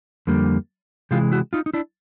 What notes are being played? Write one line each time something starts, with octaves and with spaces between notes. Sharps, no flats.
F2 D3 G3 A#3
C3 E3 G#3 F4 G4
E4 F#4
D#4 F4
D#4
D4 E4